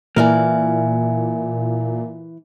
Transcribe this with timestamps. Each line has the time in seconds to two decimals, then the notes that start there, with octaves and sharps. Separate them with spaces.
0.16 A#2 E3 A#3 E4 A#4 D5 E5 G#5